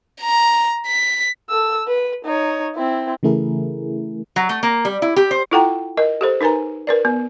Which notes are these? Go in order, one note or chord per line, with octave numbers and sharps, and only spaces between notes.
A#5
B6
A4 E6
B4
D#4 C#5
C4 E4
C#3 E3 A3 E4 G#4 A#4
F#3
A3
A#3
G3
E4
G4
C5
E4 F4 A4 F#5 G5 A#5
A#4 D#5
G4 A4 C5
D#4 A#4 B4 G#5 A#5
A#4 B4 D5
B3